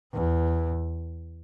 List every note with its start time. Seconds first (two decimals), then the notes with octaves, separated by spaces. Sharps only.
0.13 E2